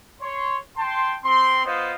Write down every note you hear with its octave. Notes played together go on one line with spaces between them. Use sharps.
C#5 C6
G5 A5 C6
C4 C6
B3 F4 C5 D#5